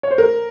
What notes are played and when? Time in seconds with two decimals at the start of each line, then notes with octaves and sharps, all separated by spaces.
0.03 C#5
0.11 C5
0.18 A#4